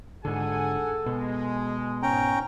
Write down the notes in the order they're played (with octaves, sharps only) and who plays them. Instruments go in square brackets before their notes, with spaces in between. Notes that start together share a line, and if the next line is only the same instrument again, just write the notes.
[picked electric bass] G#2 D3 [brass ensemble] G#4 F#5 G#5 [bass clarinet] A4
[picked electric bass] B2 [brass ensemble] G#3
[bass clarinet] G#2 [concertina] C#4 G5 A#5